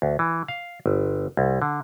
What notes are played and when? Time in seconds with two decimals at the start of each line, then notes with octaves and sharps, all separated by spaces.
0.02 D2
0.19 E3
0.48 F5
0.86 G1
1.37 C2
1.62 D3